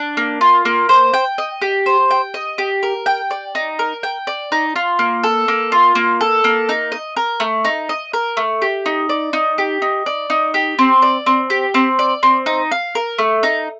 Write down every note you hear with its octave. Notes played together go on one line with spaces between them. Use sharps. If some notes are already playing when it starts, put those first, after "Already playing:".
Already playing: D4
A#3
F4
A#3
C5
G5
D#5
G4
C5
G5
D#5
G4
A#4
G5
D5
D#4
A#4
G5
D5
D#4
F4
A#3
A4
A#3
F4
A#3
A4
A#3
D#4
D#5
A#4
A3
D#4
D#5
A#4
A3
G4
D#4
D5
D#4
G4
D#4
D5
D#4
G4
C4
D5
C4
G4
C4
D5
C4
D#4
F5
A#4
A3
D#4